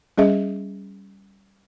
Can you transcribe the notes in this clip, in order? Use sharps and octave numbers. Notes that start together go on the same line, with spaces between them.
G3 C#4 G#4 D#5 E5